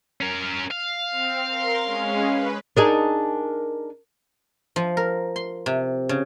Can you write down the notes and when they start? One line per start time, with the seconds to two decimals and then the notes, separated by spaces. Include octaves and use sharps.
0.21 C#4 A#4
0.71 F5
1.11 C4
1.47 A#4 C6
1.83 G#3 C#4
2.26 B4
2.77 D4 D#4 G#4 A#4
4.76 F3
4.97 A#4
5.36 C6
5.66 C3
6.09 C#3